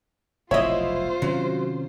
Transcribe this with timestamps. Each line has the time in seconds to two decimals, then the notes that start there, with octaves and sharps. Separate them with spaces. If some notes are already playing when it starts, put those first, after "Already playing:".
0.51 F1 B1 E4 F4 C5 C#5 D#5 E5
1.22 C3 D#3 F#3 C#4